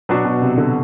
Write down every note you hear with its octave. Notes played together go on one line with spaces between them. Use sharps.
B2 F#3 B3 D4 F#4
B2
C3
D3